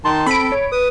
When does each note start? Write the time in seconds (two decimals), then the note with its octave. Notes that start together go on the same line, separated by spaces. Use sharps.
0.05 D#3 D#4 A5 C6
0.26 C4 A4 B5 D7
0.52 C#5
0.72 B4 D#6